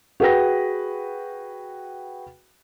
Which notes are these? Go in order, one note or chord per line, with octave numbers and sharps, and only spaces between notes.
F#4 G#4 B4 G5 A#6